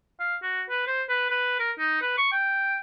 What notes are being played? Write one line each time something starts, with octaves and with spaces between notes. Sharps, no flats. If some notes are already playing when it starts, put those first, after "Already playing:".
F5
F#4
B4
C5
B4
B4
A#4
D#4
B4
C#6
G5